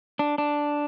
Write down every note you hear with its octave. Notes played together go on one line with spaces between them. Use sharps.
D4
D4